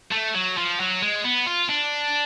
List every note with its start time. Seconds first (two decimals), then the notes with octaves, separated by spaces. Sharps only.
0.12 A3
0.35 F#3
0.58 F3
0.80 F#3
1.02 G#3
1.24 B3
1.46 F4
1.69 D4